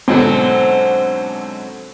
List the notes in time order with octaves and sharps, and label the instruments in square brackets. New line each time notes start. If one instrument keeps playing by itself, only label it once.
[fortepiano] G#2 B2 D3 [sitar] F#3 C4